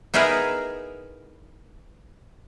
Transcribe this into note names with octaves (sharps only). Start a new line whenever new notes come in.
B3 D#4 E4 G#4 A#4 B4